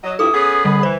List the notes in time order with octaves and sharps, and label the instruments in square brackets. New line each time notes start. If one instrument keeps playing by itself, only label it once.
[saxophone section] F#3 D#5
[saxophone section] G2 F3 E4 [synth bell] A4 D6 [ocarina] D#6
[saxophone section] B3 C#4 G#4
[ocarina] D#6
[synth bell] D3 G3 [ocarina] B5
[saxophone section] E3 [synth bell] C5